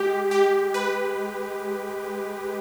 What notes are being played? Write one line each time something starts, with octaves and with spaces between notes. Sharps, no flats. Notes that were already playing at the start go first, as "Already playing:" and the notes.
Already playing: G#3 G4
G4
B4